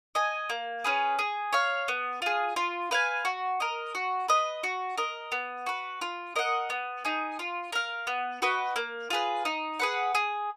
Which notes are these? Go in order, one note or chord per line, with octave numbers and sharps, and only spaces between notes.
D#5 G#5
A#3
C#4 G#4 B4
G#4
C#5 F5
B3
F4 G#4
F4
B4 F5 G#5
F#4
A#4 D#5
F#4
B4 D#5
F#4
A#4 D#5
B3
F#4 B4
F4
A#4 D#5 F#5
B3
D#4 G#4
F4
A#4 F5
B3
F#4 B4 D#5
A#3
F4 G#4 B4
D#4
G#4 B4 F#5
G#4